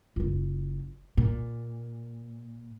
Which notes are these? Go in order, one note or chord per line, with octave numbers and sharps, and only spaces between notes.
F#1 F4
A#2